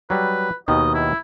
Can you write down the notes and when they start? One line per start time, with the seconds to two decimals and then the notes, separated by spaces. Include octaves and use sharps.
0.10 F#3 G3 B4
0.68 D#2 B2 D#3 D#5
0.95 E4